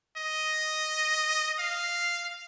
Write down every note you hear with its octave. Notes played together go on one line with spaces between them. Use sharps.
D#5
F5